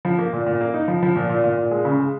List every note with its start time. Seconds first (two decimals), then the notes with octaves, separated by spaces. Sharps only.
0.05 F3
0.18 A#3
0.33 A#2
0.46 A#2
0.61 A#3
0.74 D#4
0.88 F3
1.02 F3
1.16 A#2
1.29 A#2
1.44 A#2
1.58 A#2
1.71 G#3
1.85 C#3
1.99 G#3